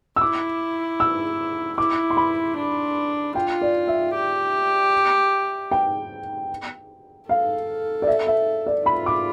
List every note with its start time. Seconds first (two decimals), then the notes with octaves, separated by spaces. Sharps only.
0.16 E6
0.20 E4 D6
1.00 E6
1.78 E4 D6
2.10 C6
2.17 B5
2.57 D4
3.35 F4 G5
3.62 D5
3.88 E5
4.14 G4
5.71 G5
7.29 A4 F5
8.02 D5
8.07 E5
8.27 E5
8.66 D5
8.86 F4 B5
9.06 D6